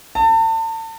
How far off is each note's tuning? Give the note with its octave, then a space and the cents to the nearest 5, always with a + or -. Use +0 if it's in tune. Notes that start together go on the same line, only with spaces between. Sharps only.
A5 +35